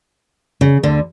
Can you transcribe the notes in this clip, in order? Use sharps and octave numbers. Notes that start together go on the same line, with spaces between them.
C#3
D2 D3